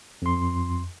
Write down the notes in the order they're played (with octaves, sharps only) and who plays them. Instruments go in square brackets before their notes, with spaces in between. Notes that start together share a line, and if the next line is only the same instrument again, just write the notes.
[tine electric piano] F2 C6